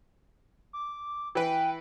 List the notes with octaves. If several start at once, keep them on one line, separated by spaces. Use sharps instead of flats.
D6
E3 B4 G5